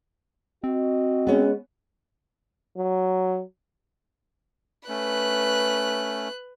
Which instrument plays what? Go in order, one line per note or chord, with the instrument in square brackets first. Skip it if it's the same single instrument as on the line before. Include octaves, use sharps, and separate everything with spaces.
[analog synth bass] C4 [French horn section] F#4 D#5
[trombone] G#3 [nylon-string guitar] B3 C#4
[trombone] F#3
[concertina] A3 C#4 [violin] B4 F#6